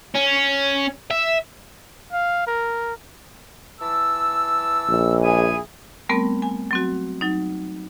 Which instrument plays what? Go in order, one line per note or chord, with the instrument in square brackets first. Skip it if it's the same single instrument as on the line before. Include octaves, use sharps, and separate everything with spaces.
[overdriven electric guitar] C#4
E5
[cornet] F5
A#4
[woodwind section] E3 A5 E6
[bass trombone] A#1
[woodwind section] E4 G#4 G#5
[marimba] G3 A3 B3 C4 A#4
G#5
F#3 C4 F#4
F#3 D#4